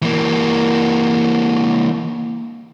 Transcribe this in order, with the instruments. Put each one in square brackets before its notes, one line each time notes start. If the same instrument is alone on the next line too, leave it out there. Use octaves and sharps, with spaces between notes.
[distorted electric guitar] E3 A#3